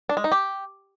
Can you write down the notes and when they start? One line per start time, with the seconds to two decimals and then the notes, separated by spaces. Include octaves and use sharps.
0.09 D4
0.17 G#3
0.24 D#4
0.32 G4